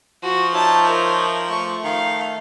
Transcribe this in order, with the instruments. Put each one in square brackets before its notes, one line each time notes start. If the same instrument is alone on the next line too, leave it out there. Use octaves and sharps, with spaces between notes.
[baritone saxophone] F3 [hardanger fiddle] F#4
[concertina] D#4 C#5 E5 [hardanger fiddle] A5
[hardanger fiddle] A#4
[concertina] A3 [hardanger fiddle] C#6
[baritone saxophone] D#3 [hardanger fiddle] F5